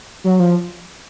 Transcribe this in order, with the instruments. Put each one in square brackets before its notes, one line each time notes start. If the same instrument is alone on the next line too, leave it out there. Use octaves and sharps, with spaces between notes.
[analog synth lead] F#3
F3